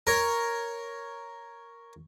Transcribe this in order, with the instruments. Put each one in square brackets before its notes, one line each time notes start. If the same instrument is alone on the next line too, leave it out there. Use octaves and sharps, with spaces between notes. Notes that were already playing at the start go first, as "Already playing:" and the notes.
[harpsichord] A#4 C#5